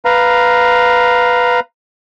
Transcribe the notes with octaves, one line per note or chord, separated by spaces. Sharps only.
B4 F5 A#5